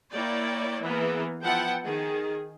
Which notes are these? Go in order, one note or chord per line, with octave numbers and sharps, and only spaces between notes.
A#3 E4 C#5 D5 G5
E3 A#3 B3 G#4 A#4
F3 B3 E4 F#5 G5 A5
D#3 G#4